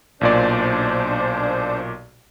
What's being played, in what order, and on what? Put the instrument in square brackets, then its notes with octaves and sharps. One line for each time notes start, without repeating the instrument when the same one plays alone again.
[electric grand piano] B1 A#2 D5 [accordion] D4 C5